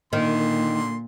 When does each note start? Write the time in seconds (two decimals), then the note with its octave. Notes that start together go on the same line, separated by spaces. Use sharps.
0.13 A#2 D3 D#3 C6